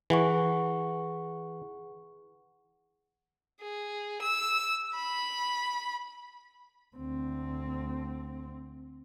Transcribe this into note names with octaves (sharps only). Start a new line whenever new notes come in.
E3 G#4 F#5 C#6
G#4
E6
B5
D2 C4